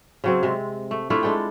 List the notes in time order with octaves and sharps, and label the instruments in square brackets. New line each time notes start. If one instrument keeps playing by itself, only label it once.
[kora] C#3 F#3 C4
C3 G#3
A3
A3 D4 E4 F4
G#3 D4 A4 G5